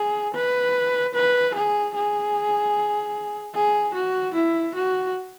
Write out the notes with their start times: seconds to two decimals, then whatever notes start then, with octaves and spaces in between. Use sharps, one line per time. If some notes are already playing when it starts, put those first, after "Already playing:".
Already playing: G#4
0.35 B4
1.14 B4
1.55 G#4
1.95 G#4
3.55 G#4
3.94 F#4
4.34 E4
4.75 F#4